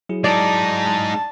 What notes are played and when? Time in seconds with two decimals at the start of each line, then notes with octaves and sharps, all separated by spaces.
0.09 F#3 E4 G#4
0.24 G#3 D#4 D5 A5